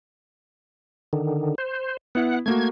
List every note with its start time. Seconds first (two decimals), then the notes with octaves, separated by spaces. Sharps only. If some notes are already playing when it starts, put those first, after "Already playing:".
1.13 D3 D#3
1.58 C5
2.15 B3 E4 F#5
2.46 A3 A#3 F#4 G#6